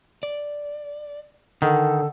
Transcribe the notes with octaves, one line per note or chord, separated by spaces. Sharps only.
D5
D3 D#3 A4 F#5